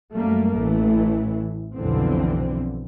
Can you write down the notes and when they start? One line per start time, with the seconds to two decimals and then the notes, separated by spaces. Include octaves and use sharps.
0.12 F#2 G3 A3 A#3
0.54 A1 E3 A3
1.77 B1 F2 D3 E3 C4